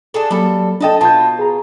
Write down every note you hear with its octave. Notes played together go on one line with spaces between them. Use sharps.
D4 G#4 A4
F#3 G3 A#3 A4
D4 A4 D#5 G5 A5
B2 F4 A5 G6
G#4 A#5